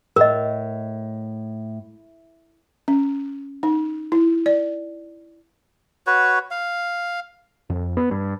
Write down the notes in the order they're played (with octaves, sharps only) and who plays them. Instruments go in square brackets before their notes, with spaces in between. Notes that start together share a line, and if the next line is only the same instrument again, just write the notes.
[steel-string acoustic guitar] A2 [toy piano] A#4 D#5
[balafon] C#4
D#4
E4
D5
[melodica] F#4 B4 C#5
F5
[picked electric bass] F2
B3
G2